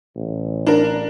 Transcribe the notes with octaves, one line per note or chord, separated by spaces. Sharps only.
A1
D4 A#4